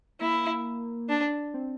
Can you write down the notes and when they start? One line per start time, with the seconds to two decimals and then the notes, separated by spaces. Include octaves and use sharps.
0.21 A#3 E4
1.09 D4
1.54 C4